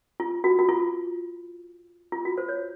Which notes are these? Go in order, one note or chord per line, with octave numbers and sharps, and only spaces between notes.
F4
F#4
F#4
F4
F4
F#4
C5
C#5